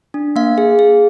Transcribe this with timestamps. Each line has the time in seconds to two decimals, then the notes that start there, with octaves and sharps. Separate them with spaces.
0.14 D4
0.36 A#3 F5
0.58 G#4
0.79 G#4